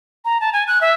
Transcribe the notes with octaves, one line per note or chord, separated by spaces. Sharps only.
A#5
A5
G#5
F#6
E5